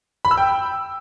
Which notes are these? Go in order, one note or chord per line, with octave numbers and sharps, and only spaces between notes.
B5
E6
G5